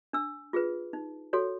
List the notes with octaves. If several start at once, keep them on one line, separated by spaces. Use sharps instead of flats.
D4 E6
F4 G#4 B4
D#4
F#4 A4 C#5